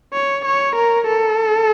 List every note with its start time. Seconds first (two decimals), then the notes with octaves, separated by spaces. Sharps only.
0.13 C#5
0.45 C#5
0.76 A#4
1.07 A4